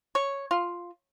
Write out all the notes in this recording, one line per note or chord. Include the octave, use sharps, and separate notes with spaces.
C#5
F4